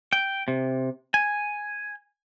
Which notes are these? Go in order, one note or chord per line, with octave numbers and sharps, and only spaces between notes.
G5
C3
G#5